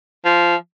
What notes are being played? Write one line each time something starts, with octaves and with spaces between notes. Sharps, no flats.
F3